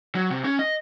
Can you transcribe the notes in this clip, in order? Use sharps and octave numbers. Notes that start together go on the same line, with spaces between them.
F#3
C3
C#4
D#5